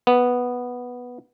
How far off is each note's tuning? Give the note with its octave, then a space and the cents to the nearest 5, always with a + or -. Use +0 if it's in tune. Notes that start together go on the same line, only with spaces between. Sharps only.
B3 -5